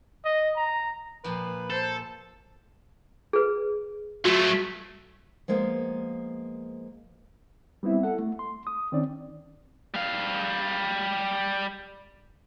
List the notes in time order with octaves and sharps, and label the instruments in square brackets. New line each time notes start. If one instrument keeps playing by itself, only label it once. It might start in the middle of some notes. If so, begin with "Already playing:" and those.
[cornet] D#5
A#5
[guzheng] A#2 F3 [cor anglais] B4
[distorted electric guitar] A4 [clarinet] C5
[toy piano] G#4 B4
[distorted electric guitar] F#3 A3 [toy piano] F#4
[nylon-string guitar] F3 G#3 A#3 B3
[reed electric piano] G3 B3 C4 E4 E5
A4 F#5
A3
C6
D#6
D#3 C4 C#4 D5
[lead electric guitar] G3 F5